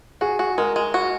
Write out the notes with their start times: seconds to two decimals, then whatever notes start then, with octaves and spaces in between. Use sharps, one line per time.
0.21 F#4 G#4
0.39 F#4
0.58 G#3 A#4
0.76 G#3
0.94 F#4